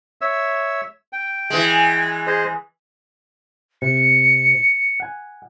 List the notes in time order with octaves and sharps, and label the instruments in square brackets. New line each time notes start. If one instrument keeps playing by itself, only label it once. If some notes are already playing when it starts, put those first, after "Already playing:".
[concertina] C#5 E5 E6
G5
[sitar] E3 G#3
[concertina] G#4 C5 D#5
[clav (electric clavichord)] C3 [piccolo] C#7
[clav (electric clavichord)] F#5 G#5